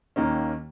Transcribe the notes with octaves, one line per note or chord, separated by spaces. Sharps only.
D#2 D#3 A#3 C#4